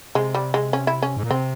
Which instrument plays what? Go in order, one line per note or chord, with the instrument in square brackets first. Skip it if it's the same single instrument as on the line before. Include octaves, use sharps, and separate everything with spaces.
[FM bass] C3 [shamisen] G#3
[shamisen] G3
G#3
C#4
E4
C#4
[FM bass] G#2
A#2
[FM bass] C3 [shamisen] C4